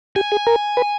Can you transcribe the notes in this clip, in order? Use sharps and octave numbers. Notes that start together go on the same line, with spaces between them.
G4 G#5
G#4
A#4
B4